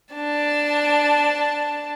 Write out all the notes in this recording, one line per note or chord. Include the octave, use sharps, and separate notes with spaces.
D4 A5